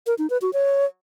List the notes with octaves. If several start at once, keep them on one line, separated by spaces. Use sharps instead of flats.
A#4
D#4
B4
F#4
C#5